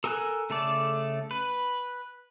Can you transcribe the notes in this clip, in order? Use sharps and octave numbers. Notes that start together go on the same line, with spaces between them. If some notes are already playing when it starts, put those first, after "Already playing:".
A4 A#4 G#5 E6 F#6
C#3 A3 A4 D5
B4